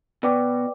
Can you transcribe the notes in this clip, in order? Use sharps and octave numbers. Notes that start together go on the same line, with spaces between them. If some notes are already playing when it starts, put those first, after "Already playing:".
B2 B4 D5 G5 D6